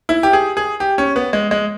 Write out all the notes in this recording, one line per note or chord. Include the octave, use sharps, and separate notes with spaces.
E4
G4
G#4
G#4
G4
C#4
B3
G#3
G#3